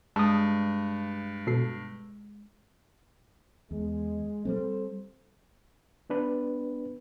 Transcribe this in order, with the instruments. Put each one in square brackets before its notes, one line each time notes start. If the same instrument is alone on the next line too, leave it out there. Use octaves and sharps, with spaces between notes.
[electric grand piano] G2 [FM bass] G#3 [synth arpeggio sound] A5 D#6
[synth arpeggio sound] B2 A4 C7
[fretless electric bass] E2 [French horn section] G#3
[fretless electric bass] G3 G#3 C4 [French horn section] A4 C5
[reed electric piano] B3 D4 B4